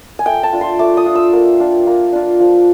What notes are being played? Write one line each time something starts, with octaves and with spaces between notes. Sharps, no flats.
G#5
A3 G5
A5
D4 F4
C6
A3 D6
D#6
D4 F4
E6
A#3
D4 F4
A#3
D4 F4
F3